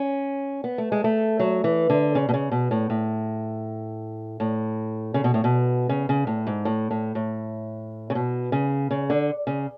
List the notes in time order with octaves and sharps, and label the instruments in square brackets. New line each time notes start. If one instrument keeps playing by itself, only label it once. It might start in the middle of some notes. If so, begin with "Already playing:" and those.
Already playing: [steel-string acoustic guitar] C#4
B3
A3
G#3
A3
F#3
E3
D3
C#3
B2
C#3
B2
A2
A2
A2
C#3
B2
A2
B2
C#3
C#3
A2
G#2
A2
A2
A2
C#3
B2
C#3
C#3
D3
C#3